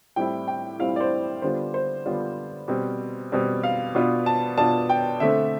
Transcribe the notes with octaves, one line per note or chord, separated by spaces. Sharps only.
A2 G3 C4 E4 G5
G5
A2 G3 C4 E4 F5
D5
C5
D3 G3 B3 D4 F4 C5
C5
D3 G3 B3 D4 F4
B2 G3 C4
B2 G3 C4
F5
B2 B3 D4 F4
A5
B2 B3 D4 F4 A5
G5
D3 A3 C4 E5